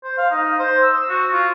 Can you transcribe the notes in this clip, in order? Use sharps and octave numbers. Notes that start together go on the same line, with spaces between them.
C5
F5
D#4
C5
E6
F#4
F4